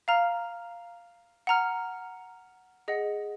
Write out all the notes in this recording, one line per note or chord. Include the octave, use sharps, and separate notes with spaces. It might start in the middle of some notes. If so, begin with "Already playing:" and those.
F5 A#5 F6
F#5 A#5 F6
G#4 D#5 F#5